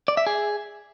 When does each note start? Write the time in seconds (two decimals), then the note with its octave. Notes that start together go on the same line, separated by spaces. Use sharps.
0.08 D5
0.17 E5
0.27 G#4